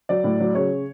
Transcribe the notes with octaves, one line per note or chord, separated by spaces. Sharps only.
F#3 D5
A2
F#3
C#3 C#5